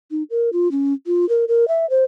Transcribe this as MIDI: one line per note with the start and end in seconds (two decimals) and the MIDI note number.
0.11 0.23 63
0.30 0.50 70
0.53 0.71 65
0.71 0.93 61
1.07 1.28 65
1.29 1.45 70
1.48 1.68 70
1.68 1.89 76
1.90 2.04 72